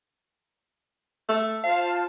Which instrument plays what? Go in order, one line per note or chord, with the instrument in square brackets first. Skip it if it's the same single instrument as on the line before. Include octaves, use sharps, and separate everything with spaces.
[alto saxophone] A3
[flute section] F4 C5 A5 [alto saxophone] F5